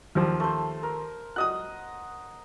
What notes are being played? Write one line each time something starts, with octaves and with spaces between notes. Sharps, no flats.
D#2 F3
A3 C5
A#4
D#5 F#5 D#6 F#6